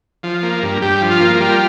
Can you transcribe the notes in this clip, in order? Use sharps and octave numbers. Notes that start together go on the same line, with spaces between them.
F3
A#3
G2
G2 G4
F3
F4
A#3
G3 F4